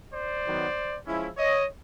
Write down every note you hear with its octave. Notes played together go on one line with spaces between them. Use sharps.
C5 D5
D#3 F#3 B3
F3 G#3 C#4 E4
C#5 D#5